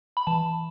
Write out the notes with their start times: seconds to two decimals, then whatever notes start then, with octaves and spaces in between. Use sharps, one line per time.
0.17 B5
0.27 E3 A5